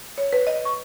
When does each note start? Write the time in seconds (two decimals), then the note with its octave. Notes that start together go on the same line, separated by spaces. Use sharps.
0.18 C#5
0.33 B4
0.47 D#5
0.65 C#6